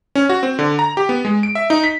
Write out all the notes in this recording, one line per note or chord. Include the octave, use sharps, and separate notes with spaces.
C#4
F#4
C4
D3
A#5
G4
B3
G#3
D7
E5
D#4
B6